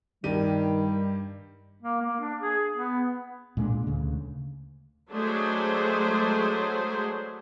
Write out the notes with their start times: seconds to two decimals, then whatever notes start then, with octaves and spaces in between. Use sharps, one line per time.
0.24 G2 D#3 G3 G4 D#7
1.82 A#3
2.02 A#3
2.21 D4
2.41 G#4
2.77 B3
3.57 A#2 G#3 B3 D4
3.87 D2 C#3
5.11 F#3 G#3 A3 D4 G#4 C5